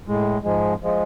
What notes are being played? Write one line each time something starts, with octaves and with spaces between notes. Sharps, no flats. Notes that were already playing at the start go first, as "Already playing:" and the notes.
A2 G#3
G#2 F3 G#3
F3 G#3